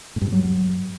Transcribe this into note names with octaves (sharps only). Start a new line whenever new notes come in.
A2
G2
C3
F#3